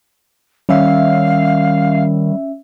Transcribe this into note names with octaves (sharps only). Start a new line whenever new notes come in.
D#3 G3 C#4 E5 F5